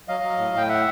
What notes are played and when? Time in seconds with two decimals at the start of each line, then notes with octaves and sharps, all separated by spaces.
0.08 F#3 D#5 F5
0.23 F#3
0.38 A2
0.53 A2 G5
0.69 E5 F#5